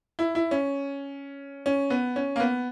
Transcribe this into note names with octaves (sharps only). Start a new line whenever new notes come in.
E4
E4
C#4
C#4
B3
C#4
A#3
B3